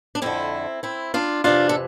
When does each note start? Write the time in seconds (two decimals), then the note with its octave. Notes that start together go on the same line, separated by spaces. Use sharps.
0.15 D4
0.22 F2 D3 C4 E4
0.83 C4 E4
1.14 D4 F4
1.44 F2 C3 E3 D4 F4
1.69 A4